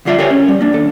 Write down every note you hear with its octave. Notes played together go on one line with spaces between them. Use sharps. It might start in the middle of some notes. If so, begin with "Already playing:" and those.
F2 D3 G3 F4 D5 E5
G4 A4 A#4 C5 C#5 G#5
C#4
G3
A#3 D4
D#2 A4